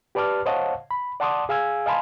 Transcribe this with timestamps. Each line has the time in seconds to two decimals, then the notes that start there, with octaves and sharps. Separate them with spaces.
0.15 G4 B4 D5 A5 D6 F6
0.46 C5 C#5 D#5 F5 F#5 A5
0.91 B5
1.20 D5 F#5 A5 C6 D6 D#6
1.49 G#4 F5 G#5 E6 G#6
1.86 D#5 F5 G#5 A5 B5 C6